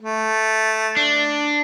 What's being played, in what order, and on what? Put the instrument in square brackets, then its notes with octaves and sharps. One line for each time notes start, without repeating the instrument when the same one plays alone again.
[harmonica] A3
[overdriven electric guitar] D4